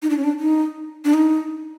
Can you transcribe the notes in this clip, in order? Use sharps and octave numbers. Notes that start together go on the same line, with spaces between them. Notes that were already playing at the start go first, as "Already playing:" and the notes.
D#4
D4
C#4
D4
D#4
D4
D#4